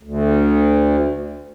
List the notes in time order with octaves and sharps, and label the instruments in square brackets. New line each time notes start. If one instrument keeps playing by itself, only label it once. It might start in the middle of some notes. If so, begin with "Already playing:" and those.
[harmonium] D2